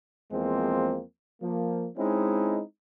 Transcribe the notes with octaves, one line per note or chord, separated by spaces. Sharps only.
E2 F3 G#3 A#3 C4
F3 A#3
G#3 C4 C#4 D#4 E4